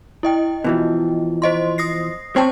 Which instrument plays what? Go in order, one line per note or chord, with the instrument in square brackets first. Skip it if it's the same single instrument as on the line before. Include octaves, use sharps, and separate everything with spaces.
[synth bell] E4 D#5 G5
[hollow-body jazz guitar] B2 E3 F3
[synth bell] C5 D#5 C6
D#6 A#6 C7
[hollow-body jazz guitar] C4 C#5 [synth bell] C5 G5 A5